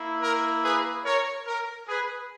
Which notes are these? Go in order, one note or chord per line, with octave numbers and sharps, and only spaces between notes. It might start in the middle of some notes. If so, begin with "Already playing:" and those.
Already playing: A#3 E4
A#4
G#4 B4
A#4 C#5
A#4
G#4 B4